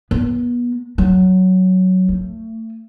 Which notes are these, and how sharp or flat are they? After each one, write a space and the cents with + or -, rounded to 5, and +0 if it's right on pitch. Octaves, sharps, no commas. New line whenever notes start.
B3 -30
F#3 +5
A3 +30